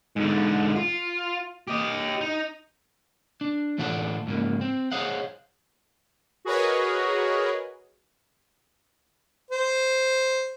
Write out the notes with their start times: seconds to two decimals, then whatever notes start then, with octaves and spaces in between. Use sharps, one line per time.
0.16 G#2 D3
0.76 F4
1.68 G4 D#5
2.21 D#4
3.41 D4
3.78 A2 E3 A3 D4 F4 F#5
4.27 G#2 C#3 A#3
4.61 C4
4.92 G#4 C5 C#5 D#5 F5 F#5
6.45 F#4 G#4 A#4 B4 C#5 D#5
9.51 C5